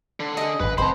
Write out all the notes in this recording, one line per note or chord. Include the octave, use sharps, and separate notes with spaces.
D3
G#4 D#5
G#1 F#2 B4
F1 A2 C4 C5 A5 B5